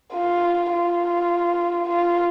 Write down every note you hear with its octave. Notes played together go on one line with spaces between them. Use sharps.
F4
F4
F4